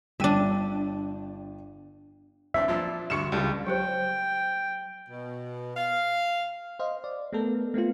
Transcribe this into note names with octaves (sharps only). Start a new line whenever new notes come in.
G1 D4 E5 G5 D#7
E3 C4 D4 E5
A#2 F3 D4
D2 G2 C#6 C#7 E7
C#2 G3 F4 A4
F#3 G4 C5 G5
B2
F5
C5 D#5 F5
D5
A3 B3 A4 A#4
A3 B3 C4 F4